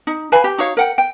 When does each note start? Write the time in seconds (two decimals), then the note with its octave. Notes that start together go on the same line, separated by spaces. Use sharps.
0.07 D#4
0.32 B4 F5 G#5 B5
0.44 G4
0.58 D#4 F#4 C#5 F5
0.77 A#4 F#5 G5
0.98 G5